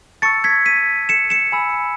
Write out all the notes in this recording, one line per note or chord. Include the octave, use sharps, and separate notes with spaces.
A5 C#6 E6 A6 C#7
G#6 B6
B6 D#7
C#7 E7
C#7 E7
G#5 B5 E6